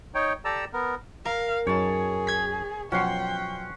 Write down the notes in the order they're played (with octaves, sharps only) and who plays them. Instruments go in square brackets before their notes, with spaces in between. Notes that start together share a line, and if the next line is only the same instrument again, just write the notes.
[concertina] D#4 C#5 G5
G4 A4 D5 A5 A#5 E6
B3 A#4
[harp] A#4 [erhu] F5
[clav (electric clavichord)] F#2 F#3 D#4 [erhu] G#4 [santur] C#5 A5
[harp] G#6 B6
[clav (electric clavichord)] B2 F3 F#3 [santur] C#4 F#5 C6 [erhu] G5